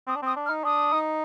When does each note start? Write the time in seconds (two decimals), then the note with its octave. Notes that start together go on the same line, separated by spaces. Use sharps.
0.08 C4 D#6
0.16 D4
0.22 C4 D#6
0.36 D4
0.46 F6
0.50 D#4
0.64 D4 D#6
0.93 D#4